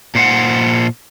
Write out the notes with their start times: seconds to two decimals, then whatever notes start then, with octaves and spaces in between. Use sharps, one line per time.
0.15 A#2 C5 F#5